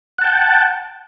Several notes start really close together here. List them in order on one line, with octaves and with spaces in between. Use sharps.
F#5 A5 G5